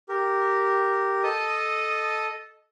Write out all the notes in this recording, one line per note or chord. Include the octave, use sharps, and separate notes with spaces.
G4 A#4
A4 D#5 A5 D#6